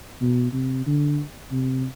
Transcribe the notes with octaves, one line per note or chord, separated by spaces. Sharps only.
B2
C3
D3
C3